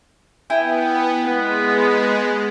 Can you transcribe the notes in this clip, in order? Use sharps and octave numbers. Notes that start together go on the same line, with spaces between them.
B3 E4 G5 G#5
G#3 B3